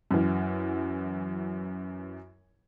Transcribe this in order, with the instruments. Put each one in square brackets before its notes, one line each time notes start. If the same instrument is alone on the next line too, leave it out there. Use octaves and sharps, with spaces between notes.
[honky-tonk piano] F#2 E3